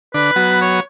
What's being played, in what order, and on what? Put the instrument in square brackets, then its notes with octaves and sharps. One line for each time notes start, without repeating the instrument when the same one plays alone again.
[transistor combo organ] D3 D4 [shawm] B4
[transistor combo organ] F#3 B3 F#4
[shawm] C#5